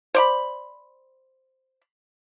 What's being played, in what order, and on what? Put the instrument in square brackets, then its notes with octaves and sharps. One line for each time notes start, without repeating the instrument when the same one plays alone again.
[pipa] C5 D5 B5